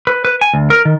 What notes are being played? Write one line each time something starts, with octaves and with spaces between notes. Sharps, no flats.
B4
B4
G#5
D2
A#4
D#3